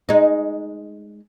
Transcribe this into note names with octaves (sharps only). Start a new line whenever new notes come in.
G#3 D#4